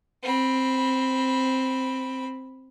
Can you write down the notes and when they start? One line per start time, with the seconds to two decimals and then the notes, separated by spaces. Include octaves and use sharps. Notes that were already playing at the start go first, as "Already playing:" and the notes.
0.23 C4 B5